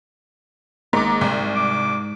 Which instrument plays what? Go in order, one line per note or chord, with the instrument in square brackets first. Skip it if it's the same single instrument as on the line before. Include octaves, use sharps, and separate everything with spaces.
[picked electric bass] G#1 A#3 [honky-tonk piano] G#2 D6
[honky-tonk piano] C2 [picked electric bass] G#2
[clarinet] D6